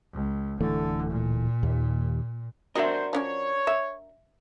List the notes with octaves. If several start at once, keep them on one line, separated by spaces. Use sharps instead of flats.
C#2
D1 D3 E3 A3
A#2
D#2
D4 F#4 A#4 C5 D#5 E5
F3 C#4 C#5 D5
E5